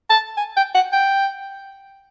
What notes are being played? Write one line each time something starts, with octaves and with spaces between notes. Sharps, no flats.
A5
G#5
G5
F#5
G5